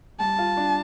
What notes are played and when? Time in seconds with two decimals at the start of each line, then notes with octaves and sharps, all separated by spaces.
0.20 G3 A5
0.39 F4
0.57 D4